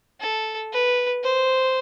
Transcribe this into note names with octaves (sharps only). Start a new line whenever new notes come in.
A4
B4
C5